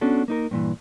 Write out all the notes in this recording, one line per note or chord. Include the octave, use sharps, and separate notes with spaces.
B3 C#4 D4 F#4 A4
A#3 D#4 A#4
G2 A#2 E3